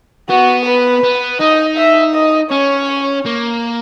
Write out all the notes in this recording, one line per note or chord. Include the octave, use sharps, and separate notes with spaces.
B3 F#4
B4
B3
D#4 D#5
E5
D#5
C#4 C#5
A#3